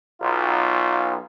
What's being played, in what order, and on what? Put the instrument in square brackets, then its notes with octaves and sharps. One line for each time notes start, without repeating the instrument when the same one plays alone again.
[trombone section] B1 F4